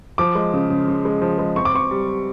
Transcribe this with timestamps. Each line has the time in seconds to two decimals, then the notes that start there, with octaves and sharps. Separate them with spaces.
0.18 F3 D6
0.35 G#3
0.54 C#3
0.70 C#3
0.88 C#3
1.05 G#3
1.22 F3
1.39 G#3
1.56 C4 C#6
1.65 D6
1.74 C4 C#6
1.91 G3
2.08 G3